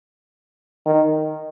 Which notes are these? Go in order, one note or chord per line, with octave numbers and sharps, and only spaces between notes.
D#3